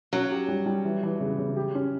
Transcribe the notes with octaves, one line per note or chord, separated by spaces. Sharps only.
F#3 C#4
G4
G3
G3
E3
E3
C#3
C#3
G4
C#4